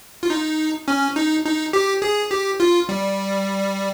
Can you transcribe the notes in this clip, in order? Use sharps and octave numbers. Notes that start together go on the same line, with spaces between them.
F4
D#4
C#4
D#4
D#4
G4
G#4
G4
F4
G3